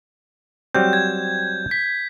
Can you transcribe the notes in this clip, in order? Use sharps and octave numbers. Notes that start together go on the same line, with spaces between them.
F#3 G3 C4 G6
G#6
B6